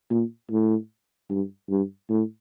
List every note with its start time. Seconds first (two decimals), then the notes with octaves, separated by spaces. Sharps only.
0.10 A#2
0.51 A2
1.30 G2
1.69 G2
2.10 A2